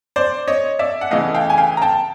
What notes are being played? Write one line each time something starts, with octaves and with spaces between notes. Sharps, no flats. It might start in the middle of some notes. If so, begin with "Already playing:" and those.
C5 D5
C#5 D#5
D5 E5
F#5
C#3 E3 A3 D#5 F5
F5 G5
G#5
F5 G5
A#5
G5 A5